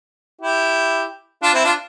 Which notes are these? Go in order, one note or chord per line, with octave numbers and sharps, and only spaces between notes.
E4 G4
D4 F4
C4 E4
D4 F4